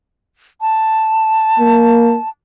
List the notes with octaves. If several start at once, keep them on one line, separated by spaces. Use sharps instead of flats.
A5
A#3